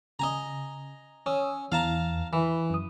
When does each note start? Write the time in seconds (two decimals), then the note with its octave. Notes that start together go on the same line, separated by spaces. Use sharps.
0.19 C#3 D#5 G#5 A#5
1.26 C#4 C#5 D#6 E6
1.72 E2 E3 F5 A5 A#5
2.33 E3 B5
2.70 F#2 D#6